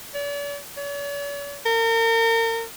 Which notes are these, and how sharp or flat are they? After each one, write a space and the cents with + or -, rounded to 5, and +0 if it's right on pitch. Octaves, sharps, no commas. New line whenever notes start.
D5 -45
C#5 +45
A#4 -35